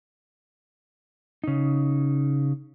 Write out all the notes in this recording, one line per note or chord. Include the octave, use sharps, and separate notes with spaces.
C#3 D#4